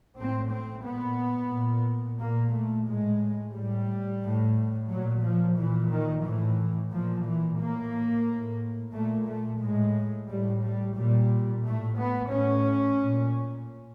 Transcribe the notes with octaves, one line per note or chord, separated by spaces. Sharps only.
A2 C4
C4
A#2 B3
A#2
A#2 A#3
A3
A2 G#3
A2 G3
A2
A#2 F#3
F3
A#2 E3
D#3
A2 E3
A#2 F3
E3
A2 A#3
A2
A#2 A3
A3
A2 G#3
A2 G3
G3
A#2 G3
A2 A3
B3
A2 C#4
A#2